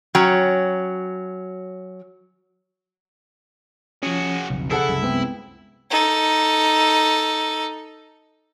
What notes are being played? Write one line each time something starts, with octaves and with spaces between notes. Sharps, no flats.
F#3 C#4 C#5 G5 A#5
F3 C#4 F#4 G#4
B1 F2 C#3
E4 G#4 A4 F#5
C2 F#2
G#3 B3 C4 G5
D#4 A4